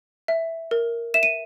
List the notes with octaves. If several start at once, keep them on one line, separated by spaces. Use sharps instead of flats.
E5
A#4
E5 E7
D#7